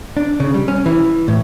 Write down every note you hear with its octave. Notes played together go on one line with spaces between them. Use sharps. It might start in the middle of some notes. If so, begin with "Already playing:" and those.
D4
C#3
G3
C#4
E3
A2